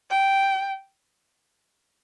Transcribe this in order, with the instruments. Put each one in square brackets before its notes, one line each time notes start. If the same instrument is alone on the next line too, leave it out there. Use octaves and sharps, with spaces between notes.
[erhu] G5